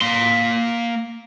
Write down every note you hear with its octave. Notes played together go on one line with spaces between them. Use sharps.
A#3 C6